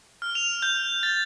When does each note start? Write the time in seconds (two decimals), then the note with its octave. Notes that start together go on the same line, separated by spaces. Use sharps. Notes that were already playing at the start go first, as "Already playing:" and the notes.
0.22 F6
0.35 F7
0.62 G6
1.03 A6